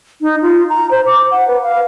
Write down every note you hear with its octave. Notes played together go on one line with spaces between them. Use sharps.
D#4
F4
A#5
C5
D6
F#5
B4
F5